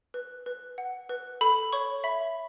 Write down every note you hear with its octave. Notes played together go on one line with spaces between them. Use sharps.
B4
B4
F#5
B4
A4 B5
C#5 C#6
E5 B5